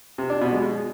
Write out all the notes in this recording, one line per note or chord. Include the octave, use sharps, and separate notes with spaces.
C3
D4
B2
G#3